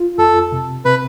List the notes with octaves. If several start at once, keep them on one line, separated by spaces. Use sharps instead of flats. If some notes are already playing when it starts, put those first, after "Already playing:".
Already playing: F4
F2 A4
C3
C3 B4